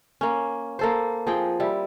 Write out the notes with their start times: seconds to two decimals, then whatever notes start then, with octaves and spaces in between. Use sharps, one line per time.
0.21 A#3 C#4
0.79 A#3 A4 C5
1.27 F3 C4 G#4 G5
1.60 G3 E4